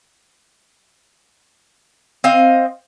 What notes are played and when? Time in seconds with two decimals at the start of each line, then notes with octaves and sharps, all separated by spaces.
2.24 C4 D#5 F5